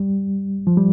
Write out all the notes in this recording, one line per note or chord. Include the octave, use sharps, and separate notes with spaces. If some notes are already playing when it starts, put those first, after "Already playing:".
Already playing: G3
F3
G3